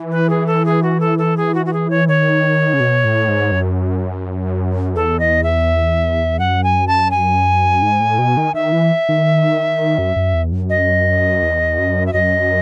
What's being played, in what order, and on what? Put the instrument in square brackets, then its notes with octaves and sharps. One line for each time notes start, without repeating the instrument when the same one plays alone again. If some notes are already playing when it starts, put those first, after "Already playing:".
Already playing: [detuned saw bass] E3
[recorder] B4
G#4
A4
G#4
F#4
A4
A4
G#4
F#4
F#4
G#4
C#5
[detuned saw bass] D#3 [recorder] C#5
[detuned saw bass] C#3
B2
A2
G#2
F#2
[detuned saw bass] E2 [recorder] A4
[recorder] D#5
E5
[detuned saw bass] F#2 [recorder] F#5
[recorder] G#5
A5
G#5
[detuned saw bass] G#2
A2
B2
D#3
[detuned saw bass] D#3 [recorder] E5
[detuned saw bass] E3
D#3
F#2
F#2
E2
F#2
[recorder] D#5
[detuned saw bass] E2
F#2
[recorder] E5
[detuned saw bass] F#2 [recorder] D#5